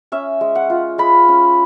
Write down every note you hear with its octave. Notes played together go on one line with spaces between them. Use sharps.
C#4 E5
G#3
F#5
F4
G#3 B5
C#4